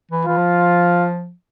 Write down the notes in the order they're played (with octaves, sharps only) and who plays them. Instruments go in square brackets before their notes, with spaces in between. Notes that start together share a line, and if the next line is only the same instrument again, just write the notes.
[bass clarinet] E3
[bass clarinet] E3 [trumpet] F4
[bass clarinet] F3